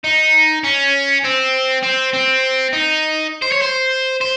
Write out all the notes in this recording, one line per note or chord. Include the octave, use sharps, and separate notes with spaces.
D#4
C#4
C4
C4
C4
D#4
C5
C#5
C5
C5